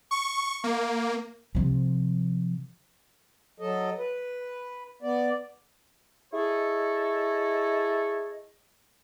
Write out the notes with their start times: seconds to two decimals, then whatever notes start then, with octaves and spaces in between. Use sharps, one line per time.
0.11 C#6
0.64 A#3
1.55 C3 F3
3.60 F#3 A4 D#5
3.98 B4
5.02 B3 D5
6.33 E4 G#4 A4 C#5 D#5